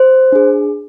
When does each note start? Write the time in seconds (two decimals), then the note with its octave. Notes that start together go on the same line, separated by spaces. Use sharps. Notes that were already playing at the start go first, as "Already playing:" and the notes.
Already playing: C5
0.32 D4 G#4